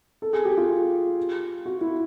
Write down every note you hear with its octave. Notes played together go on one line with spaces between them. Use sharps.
A4
G#4
G4
F4
F#4
E4